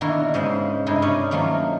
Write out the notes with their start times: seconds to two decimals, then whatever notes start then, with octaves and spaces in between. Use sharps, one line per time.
0.01 B2 D3 D#3 A#3 E4 F#4
0.34 G#2 C#3 G#3 C5 E5 F#5
0.86 G2 C3 G#3 D#4 E4
1.02 C#4 D#4 B4 C#5 D5
1.31 D#3 F3 F#3 A3 A#3